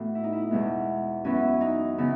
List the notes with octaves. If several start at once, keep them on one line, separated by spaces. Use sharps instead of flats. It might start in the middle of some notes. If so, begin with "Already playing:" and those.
Already playing: A2 E3 A3 B3 F#4
E4
D#4
E4
E2 B2 G#3 B3
F#2 E3 B3 C#4
D#4
C#3 E3 B3